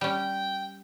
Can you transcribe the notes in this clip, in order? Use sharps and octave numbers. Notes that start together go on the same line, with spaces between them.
G3 C#4 G5